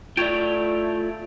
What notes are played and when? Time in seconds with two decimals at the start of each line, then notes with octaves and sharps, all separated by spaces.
0.17 A3 E4 F4 C#5 D5 G5